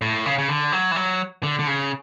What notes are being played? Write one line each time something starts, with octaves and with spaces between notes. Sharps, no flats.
A2
C#3
C#3
D3
F#3
E3
F#3
D3
D3
C#3